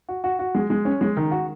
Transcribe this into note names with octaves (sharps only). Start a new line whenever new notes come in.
F#4
F#4
F#4
G#3
G#3
C#4
G#3
D#3
F#4